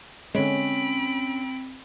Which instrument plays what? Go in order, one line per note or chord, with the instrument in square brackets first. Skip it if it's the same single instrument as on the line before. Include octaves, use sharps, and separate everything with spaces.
[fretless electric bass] D3 G#3 [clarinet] C4 [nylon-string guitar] C#4 [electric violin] B5 D7